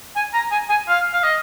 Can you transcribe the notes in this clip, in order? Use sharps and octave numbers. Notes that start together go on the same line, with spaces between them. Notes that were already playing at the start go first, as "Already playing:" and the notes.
G#5
A#5
G#5
G#5
F5
F5
D#5